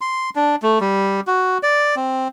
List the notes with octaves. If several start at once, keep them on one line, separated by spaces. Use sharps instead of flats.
C6
D4
A3
G3
F#4
D5
C4